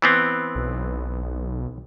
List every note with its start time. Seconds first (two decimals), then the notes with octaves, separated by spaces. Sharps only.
0.02 E3 B3 C4
0.55 B1